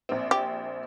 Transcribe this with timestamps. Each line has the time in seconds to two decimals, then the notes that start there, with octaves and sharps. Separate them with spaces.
0.09 A#1 C4
0.31 G4